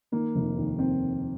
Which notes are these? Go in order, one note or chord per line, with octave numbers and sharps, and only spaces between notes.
D#3 A#3
F1
D#2
C4